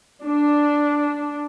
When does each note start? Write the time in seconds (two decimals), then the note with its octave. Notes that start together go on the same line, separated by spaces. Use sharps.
0.25 D4